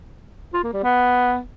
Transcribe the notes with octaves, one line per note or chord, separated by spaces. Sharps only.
F4
A#3
G3
B3